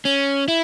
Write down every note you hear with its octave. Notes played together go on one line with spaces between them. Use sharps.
C#4
E4